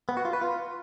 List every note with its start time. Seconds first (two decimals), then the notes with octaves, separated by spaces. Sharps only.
0.09 B3
0.17 F#4
0.25 F4
0.33 B4
0.42 F4